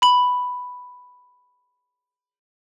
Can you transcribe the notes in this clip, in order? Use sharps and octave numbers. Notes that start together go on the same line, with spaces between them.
B5 F#7